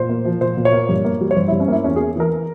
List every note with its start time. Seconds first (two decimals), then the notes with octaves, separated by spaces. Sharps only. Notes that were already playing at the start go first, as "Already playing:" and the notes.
Already playing: A#2 C5
0.09 A#3
0.25 F3
0.41 A#2 C5
0.57 A#2
0.65 C#5
0.73 A#3
0.89 G2
1.04 A#3
1.21 G3
1.31 C#5
1.36 G2 C5
1.48 G2 E4
1.60 C#4
1.68 A#3 E4
1.84 E2 C#4
1.96 A#3 G#4
2.16 E3 A#4